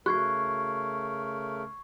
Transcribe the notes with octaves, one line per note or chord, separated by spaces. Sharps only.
C#3 A3 F#4 A#4 C#6 F#6 G#6 C7